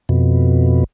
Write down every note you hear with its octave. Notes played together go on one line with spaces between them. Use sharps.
F2 B2